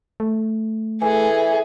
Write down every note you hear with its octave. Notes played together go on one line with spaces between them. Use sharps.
A3
E3 G#4 A4 G#5